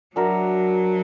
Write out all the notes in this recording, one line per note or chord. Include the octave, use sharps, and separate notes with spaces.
F#3 D4 F#4 A#4 E5